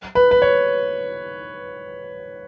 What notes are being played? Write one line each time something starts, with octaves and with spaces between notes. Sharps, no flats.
B4
B4
C#5